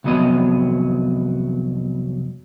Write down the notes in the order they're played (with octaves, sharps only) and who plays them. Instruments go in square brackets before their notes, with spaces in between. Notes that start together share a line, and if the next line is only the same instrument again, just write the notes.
[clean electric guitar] C2 F2 F#3 B3 D#5